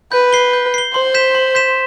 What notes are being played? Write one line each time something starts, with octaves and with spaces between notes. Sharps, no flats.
B4 G6
C7 G7
G6
C7 G7
C5 C6
G6 B6 E7
C6
G6 B6 E7